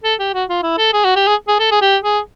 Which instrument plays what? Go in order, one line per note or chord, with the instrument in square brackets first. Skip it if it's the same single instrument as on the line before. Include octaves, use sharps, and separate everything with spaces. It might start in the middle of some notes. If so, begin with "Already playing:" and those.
[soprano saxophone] A4
G4
F#4
F4
E4
A4
G#4
F#4
G4
G#4
G#4
A4
G#4
G4
G#4